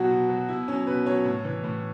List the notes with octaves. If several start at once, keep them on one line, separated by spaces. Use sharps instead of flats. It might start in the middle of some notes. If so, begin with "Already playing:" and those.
Already playing: B2 F#3 F#4
B2
F#3
B2 E4
F#3 C#4
B2 B4
F#3 C#5
A2
E3
A2